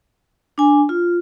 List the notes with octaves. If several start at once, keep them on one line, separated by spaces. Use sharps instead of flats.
D4 G#5
F4